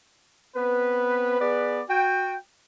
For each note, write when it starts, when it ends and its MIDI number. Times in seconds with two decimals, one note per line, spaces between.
0.55 1.37 59
0.55 1.37 60
0.55 1.37 71
1.40 1.81 59
1.40 1.81 68
1.40 1.81 71
1.40 1.81 74
1.89 2.35 66
1.89 2.35 79